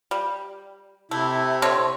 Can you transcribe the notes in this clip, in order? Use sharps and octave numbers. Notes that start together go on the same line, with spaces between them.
G3
C3 A3 E4
D3 C4 C#5